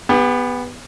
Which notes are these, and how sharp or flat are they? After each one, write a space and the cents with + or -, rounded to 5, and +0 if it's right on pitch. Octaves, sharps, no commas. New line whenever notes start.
B3 +0 G4 +40